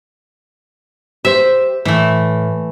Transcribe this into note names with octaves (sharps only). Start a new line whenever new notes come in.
G4 C5 E5
A2 E3 A3